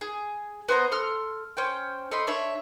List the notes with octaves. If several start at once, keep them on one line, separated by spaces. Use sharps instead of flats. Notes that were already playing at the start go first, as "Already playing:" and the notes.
G#4
B3 C5 D#5 A#5
A4 C6 F6
C#4 C5 G5
A3 D#5 B5 C6
D4 C#5 E5